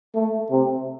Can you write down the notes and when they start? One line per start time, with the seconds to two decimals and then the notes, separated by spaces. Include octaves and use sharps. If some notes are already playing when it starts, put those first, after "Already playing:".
0.15 A3
0.51 C3